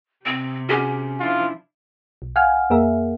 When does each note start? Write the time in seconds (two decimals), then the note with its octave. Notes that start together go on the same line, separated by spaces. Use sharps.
0.26 C3 C4
0.69 C#4 F#4 G#4 D6
1.20 F3 D4 E4 F4
2.22 B1
2.36 F5 F#5 G#5 F6
2.70 F2 A#3 G#4 A#4 E5